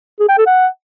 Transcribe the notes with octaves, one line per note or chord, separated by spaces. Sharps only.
G#4
G5
A4
F#5